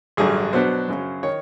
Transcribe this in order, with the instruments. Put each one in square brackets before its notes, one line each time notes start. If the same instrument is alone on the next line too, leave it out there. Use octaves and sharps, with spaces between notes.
[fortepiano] A1 G2 D3 F#3 G#4
B2 F#3 B3 D4 C5
F#2 C#3 F#3
D#3 C#5